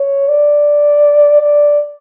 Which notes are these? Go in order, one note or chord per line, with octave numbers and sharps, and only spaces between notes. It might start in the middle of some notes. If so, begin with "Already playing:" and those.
Already playing: C#5
D5
D5